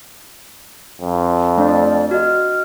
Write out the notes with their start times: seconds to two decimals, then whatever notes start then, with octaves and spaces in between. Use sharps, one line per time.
1.01 F2
1.58 A3 D4 D5
2.11 F#4 D#5 F6